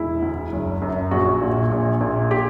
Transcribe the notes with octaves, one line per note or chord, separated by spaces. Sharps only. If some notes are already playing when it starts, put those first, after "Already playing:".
Already playing: E1 E4
D2
F#1
F#2
A#1 F#4
A#2
A#1
A#2
G4